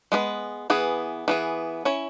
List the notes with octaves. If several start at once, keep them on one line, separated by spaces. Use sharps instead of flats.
G#3 B3 G#4 B4
E3 B3 G#4
E3 B3 G#4
C#4 E4 C#5